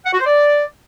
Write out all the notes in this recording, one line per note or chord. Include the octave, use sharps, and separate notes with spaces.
F#5
F#4
C5
D5